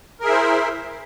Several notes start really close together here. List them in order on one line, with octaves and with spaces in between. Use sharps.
A#4 G#4 E5 E4 C5